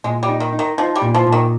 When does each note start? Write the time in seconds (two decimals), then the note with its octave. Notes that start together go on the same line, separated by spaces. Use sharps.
0.04 A#2 G#3
0.23 G3
0.29 D#4
0.40 D#3
0.53 D#4
0.59 D#3
0.78 F3 D#4
0.95 G3
1.02 A#2
1.14 F3
1.27 A#2
1.32 D#3